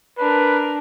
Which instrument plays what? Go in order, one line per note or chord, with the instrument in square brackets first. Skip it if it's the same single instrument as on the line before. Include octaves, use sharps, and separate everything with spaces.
[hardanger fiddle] D4 A#4 [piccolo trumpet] B4